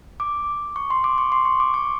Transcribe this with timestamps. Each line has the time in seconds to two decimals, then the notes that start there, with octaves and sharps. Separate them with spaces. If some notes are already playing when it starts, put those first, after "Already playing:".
0.20 D6
0.76 C#6
0.90 C6
1.04 D6
1.18 C#6
1.32 C6
1.45 C#6
1.60 D6
1.74 C#6